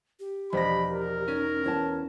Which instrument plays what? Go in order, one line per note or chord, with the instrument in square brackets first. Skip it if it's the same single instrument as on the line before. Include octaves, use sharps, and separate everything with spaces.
[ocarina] G4
[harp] E1 A#6 [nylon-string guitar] F3 D5 D#5 [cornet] B5
[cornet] A#4
[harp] C#4 [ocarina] D#4
[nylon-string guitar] E2 C#5 A5 [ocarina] E4